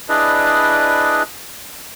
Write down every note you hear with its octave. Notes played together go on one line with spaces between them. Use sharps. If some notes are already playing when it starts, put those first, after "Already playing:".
D4 E4 G#4 B4 D5 D#5